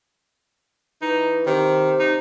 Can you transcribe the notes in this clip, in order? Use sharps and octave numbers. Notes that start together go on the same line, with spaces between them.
E3 D#4
C3 D#3
D#4